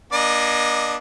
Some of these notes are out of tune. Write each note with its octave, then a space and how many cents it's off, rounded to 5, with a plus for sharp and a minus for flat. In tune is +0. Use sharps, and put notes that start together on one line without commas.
A#3 +40 D4 +0 D#5 +0